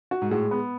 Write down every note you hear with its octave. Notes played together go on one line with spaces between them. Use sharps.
F#4
G#2
A2 G#3
B3